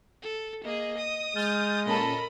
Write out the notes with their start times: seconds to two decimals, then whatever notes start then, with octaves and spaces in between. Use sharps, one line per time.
0.23 A4
0.64 A#3 G#4 D#5
0.98 D#6
1.35 G#3 F6 G6 A6
1.86 A#2 C#4 A4 A#4 D#5 A5 B5